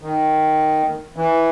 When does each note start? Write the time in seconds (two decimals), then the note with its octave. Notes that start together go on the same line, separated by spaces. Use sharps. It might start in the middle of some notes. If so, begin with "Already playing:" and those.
0.02 D#3
1.16 E3